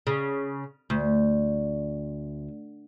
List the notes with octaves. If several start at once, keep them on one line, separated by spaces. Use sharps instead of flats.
C#3
D2